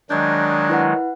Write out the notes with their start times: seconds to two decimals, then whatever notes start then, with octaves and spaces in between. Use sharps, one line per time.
0.10 D#3 F#3 G#3 D4 G6 G#6
0.69 E4 B4 F#5